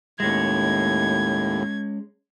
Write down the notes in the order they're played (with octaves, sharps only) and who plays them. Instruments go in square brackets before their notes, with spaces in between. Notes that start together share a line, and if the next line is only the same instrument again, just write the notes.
[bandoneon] D#2 A2 [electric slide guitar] G#3 C#4 [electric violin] G#6